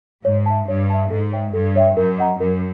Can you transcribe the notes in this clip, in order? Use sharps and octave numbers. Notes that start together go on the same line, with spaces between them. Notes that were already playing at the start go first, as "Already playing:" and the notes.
G#2 C#5
E5 A5
G2 C#5
E5 A5
G#2 A4
C#5 E5 G5
G2 A4
C#5 E5 G5
F#2 A#4
D#5 F#5 A#5
F#2 A#4